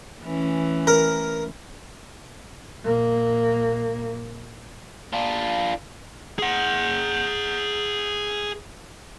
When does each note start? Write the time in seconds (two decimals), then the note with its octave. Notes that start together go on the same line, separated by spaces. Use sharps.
0.22 E3 A3 C#4
0.87 A#4
2.81 A#1 A#3
5.13 D4 F4
6.39 G#4 F#5